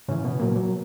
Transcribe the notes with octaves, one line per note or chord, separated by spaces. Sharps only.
G#2 C#3 E3 C#4
B2 B3
A#2 F#3 A#3
F#3